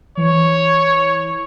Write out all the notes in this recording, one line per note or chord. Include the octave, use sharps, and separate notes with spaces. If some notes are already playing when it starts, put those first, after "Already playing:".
E3 C#5